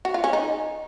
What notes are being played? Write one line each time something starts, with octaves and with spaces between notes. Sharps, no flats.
F#4
F4
C#4
D#4